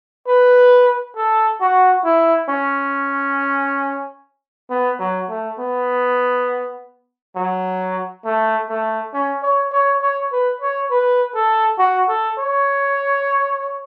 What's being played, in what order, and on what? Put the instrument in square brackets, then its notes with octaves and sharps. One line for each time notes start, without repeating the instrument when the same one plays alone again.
[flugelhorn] B4
A4
F#4
E4
C#4
B3
F#3
A3
B3
F#3
A3
A3
C#4
C#5
C#5
C#5
B4
C#5
B4
A4
F#4
A4
C#5